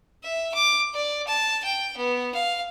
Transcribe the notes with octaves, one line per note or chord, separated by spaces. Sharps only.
E5
D6
D5
A5
G5
B3
F5